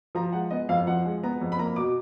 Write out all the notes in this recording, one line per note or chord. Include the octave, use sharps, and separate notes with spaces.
F3 A#5
G#3 F#5
B3 D#5
F2 F5
F3 F#5
G#3
B3 A#5
F2
B5
A#3 A#5
B2 D6